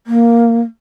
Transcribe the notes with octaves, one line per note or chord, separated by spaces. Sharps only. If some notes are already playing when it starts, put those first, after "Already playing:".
A#3